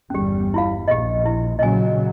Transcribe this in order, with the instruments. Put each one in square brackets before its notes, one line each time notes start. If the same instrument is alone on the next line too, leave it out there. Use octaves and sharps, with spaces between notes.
[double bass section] G1 E2 G3 [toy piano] C#4 G4
[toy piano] E4 F4 F5
[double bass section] A#1 [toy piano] G4 D#5
[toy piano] E4
[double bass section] A#2 C#3 F#3 [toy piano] D#5 G#5